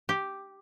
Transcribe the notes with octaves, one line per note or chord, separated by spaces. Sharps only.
G4